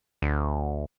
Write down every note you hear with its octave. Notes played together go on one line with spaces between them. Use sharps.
D2